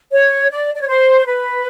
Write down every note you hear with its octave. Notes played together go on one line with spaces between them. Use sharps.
C#5
D5
D5
C#5
C5
B4